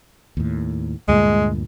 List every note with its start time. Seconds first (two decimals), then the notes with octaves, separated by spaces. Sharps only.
0.37 D#2 A2
1.08 D2 G2 A#2 G#3